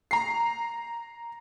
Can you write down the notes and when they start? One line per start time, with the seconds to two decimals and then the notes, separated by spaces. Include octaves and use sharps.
0.11 A#5 C7